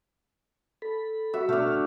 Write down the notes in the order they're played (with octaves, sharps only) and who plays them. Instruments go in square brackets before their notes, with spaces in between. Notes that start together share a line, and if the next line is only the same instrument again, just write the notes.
[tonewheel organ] A4 B5
[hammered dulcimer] F#4 E5
[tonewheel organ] B2 F6 [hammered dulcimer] A3 D4